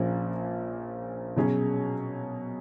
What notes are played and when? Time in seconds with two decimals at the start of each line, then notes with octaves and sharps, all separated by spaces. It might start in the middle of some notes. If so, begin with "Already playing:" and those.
Already playing: A#1 A#2 F3 A#3 C#4
1.36 B2 F#3 C#4 G#4 C#5